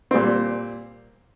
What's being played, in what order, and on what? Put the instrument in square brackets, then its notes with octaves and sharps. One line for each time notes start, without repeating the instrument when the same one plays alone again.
[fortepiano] A#2 G3 C4